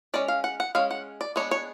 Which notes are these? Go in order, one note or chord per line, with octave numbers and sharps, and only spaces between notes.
G#3 C#4 D5
F5
F#5
F#5
G#3 C#4 F5
F#5
D5
G#3 B3 D4 C#5
C#5